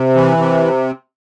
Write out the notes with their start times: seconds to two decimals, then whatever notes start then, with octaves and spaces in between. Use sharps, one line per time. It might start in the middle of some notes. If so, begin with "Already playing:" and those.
Already playing: C3
0.15 E3
0.37 C3